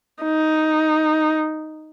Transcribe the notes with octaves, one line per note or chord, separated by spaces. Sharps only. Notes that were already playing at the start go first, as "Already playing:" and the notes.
D#4